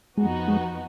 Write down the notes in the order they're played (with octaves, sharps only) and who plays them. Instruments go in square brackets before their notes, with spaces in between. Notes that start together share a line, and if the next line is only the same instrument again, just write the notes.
[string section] F2 F3 B3 D#4 F#4 [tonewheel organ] G#3
[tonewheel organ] G#3